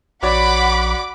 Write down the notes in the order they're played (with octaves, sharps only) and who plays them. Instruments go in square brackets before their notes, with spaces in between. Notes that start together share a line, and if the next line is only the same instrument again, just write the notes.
[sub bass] A#1 [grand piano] F#4 C#5 D5 [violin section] F#5 B5 D6